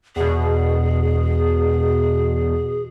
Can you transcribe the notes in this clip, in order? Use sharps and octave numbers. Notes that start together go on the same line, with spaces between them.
E2 B2 G#4